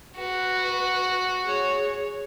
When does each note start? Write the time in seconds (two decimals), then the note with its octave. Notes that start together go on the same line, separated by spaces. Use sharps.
0.18 F#4 B4
1.45 G#4 C#5